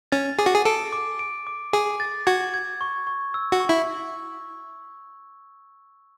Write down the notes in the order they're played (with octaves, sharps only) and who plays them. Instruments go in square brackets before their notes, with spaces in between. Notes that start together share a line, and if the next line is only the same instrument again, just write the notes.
[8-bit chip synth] C#4 [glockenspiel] A6
[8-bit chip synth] G#4 [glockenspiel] D6
[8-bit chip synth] F#4
G#4
[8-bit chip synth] A4 [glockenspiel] D7
[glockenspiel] D6
D7
D6
[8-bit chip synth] G#4 [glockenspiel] D6
[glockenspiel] A6
[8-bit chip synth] F#4 [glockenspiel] G#6
[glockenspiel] G#6
C#6
C#6
E6
[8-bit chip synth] F#4
[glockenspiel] C#6
[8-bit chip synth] E4